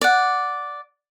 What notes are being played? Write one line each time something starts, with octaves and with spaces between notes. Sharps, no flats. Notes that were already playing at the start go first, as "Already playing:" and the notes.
D5 F#5